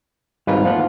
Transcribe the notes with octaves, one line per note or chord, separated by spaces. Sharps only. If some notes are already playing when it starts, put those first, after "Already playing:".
G#1 G#2 G3 F4 B4
F3 A3 A#3 F#5